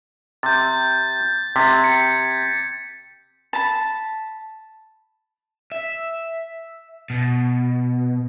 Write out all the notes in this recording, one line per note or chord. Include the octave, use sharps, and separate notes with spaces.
C3 G6 A6
C3 G#6 A6 B6
A6 C#7
A5 B5
E5
B2